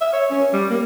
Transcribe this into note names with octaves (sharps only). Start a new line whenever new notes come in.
E5
C#5
C#4
G3
A#3